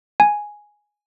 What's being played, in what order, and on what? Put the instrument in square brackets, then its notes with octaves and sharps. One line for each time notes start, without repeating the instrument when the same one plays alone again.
[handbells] G#5